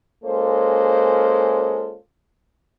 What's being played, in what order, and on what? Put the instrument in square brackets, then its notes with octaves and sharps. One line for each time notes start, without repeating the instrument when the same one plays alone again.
[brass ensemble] G#3 A#3 C#4 F4 A4 C5